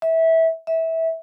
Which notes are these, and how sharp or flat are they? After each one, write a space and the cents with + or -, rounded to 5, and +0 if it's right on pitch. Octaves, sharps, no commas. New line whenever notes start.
E5 -20
E5 -20